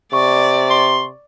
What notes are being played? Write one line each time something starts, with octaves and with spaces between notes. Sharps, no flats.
C3 D5 C#6
C6